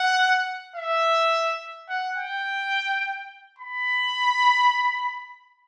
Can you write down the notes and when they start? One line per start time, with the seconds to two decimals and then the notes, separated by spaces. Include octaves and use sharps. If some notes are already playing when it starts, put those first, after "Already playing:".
Already playing: F#5
0.76 E5
1.89 F#5
2.17 G5
3.59 B5